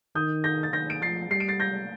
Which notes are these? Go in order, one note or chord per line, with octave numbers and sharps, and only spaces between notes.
D#3 D#6 G6
G6 A#6
A6
D#3 G6 A#6
D7
F3 A6 C7
G3 C7
D7
A6 C7
G6 A#6